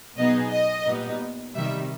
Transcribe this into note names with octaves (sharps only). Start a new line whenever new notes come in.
B2 F#3 B3 D#4 G#4 D#5
D#5
A#2 G3 B3 D#4
C3 D#3 G3 E5